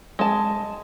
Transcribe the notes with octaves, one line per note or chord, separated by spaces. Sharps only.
G#3 A5